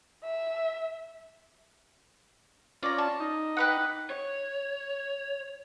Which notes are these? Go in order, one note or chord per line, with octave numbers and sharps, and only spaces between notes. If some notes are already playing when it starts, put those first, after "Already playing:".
E5
C#4 F4 D5 A#5
A5
D#4
G4 B4 F#5
C#5